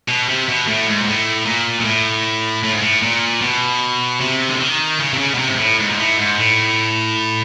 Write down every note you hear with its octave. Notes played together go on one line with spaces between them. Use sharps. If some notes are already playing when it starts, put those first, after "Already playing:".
B2
C3
B2
A2
G#2
A#2
A2
A#2
A#2
A2
A2
G#2
A2
A#2
B2
C3
D3
D#3
C#3
C3
C#3
B2
C3
G#2
A2
G#2
A#2
A2
G#2
A2